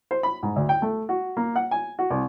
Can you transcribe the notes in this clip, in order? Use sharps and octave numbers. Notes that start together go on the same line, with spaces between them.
C5
B5
G#2
D2
G5
A3
F#4
A#3
F#5
G#5
F#4
C2